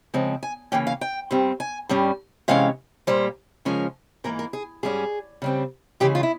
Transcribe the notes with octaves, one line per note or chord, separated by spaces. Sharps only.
C#3 F3 G#3 C4
G#5
C#3 E3 A#3 C#4 G5
F5
G5
G2 G3 C4
G#5
G2 G3 C#4
C3 E3 G#3 C#4 F5
A#2 G3 A#3 C5
C#3 F3 G#3 C#4 A#4
G#2 E3 A#3 A#4
A#4
G#4
G#2 G3 C#4 G#4
C#3 G3 C4
C#3 E3 G#3 G4
F4
E4